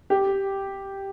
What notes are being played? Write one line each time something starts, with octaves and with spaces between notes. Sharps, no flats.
G4